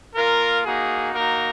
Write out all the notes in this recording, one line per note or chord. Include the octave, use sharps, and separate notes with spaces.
A#3 F4 A#4
A#3 D#4 F#4 G#4
A#3 D#4 F#4 A#4